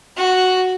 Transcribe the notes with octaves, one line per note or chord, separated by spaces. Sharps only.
F#4